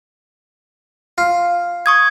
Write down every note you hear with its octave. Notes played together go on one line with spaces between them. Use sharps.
F4
C#6 D#6 G#6